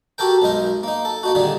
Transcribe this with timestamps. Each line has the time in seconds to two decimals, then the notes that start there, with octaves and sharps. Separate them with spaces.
0.18 F#4 G4 A4 A#4 G5
0.42 B1 G#3 D#4 A#4
0.83 A#3 D#4
1.05 A4
1.23 A#3 D#4 F#4
1.35 A#2 D3 D#3 G3 G#4